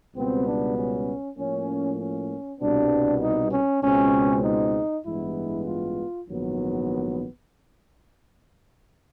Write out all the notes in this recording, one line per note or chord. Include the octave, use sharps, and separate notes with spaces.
C#2 B2 G3 B3 C4
D4
C#4
A2 F3 A#3 C#4
C#4
C2 B2 G3 B3 D4
D#4
C#4
C#2 B2 G#3 C4 C#4
D#4
A1 G2 E3 G#3 B3 E4
F4
A#1 G#2 D#3 F#3 B3